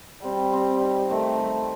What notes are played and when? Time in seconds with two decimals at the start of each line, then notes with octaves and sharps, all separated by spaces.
0.24 G3 C4
0.53 C4
0.82 D#4
1.11 D#3 A3
1.39 G3